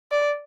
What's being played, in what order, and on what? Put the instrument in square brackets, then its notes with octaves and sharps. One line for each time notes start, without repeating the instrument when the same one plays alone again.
[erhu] D5